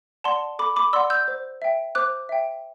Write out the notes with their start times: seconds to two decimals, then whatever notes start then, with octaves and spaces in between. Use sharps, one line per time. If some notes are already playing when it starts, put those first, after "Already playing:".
0.24 D5 F#5 A5 C6
0.59 A4 B5 D6
0.76 B5 D6
0.93 D5 F#5 C6 E6
1.10 E6 G6
1.28 C5
1.62 E5 G5
1.95 C5 D6 F#6
2.29 E5 G5